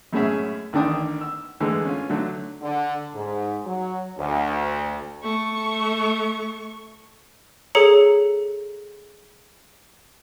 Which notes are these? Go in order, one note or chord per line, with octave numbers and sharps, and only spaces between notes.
F#2 A2 G#3 C#4 G#4 E5
A1 D3 D#3 D4 G5 D#6
E6
D3 E3 G#3 A3
C#4 F4
D3 F#3 A3
D3
G#2
F#3
D2
A3 C#6
G#4 A4 C#5 A#5 C#7 F#7